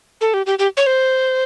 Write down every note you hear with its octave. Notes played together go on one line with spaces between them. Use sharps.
A4
G4
G4
G4
C#5
C5